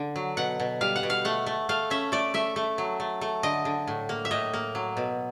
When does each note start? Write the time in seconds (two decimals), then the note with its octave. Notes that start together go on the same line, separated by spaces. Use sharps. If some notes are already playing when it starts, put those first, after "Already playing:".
Already playing: D3
0.16 F#3
0.37 B2 F#5
0.60 B2
0.81 G3 F5
0.96 F#5
1.03 B2
1.10 F5
1.25 A3 F#5
1.46 A3
1.69 A3 F5
1.90 C#4 E5
2.12 A3 D5
2.34 A3 E5
2.56 A3
2.78 F#3
3.00 A3
3.21 A3
3.43 D3 D#5
3.65 D3
3.87 A2
4.09 A#3
4.25 E5
4.31 A2 D#5
4.54 A#3
4.75 F#3
4.97 B2